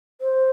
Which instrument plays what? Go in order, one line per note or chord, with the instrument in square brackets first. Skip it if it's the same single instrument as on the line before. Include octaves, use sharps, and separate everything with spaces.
[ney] C5